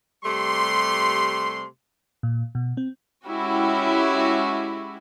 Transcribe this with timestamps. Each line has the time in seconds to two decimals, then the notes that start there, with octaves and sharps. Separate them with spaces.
0.24 C3 G3 A3 C6
2.23 A#2
2.55 B2
2.77 C4
3.27 G#3 C#4 E4 F#4 G4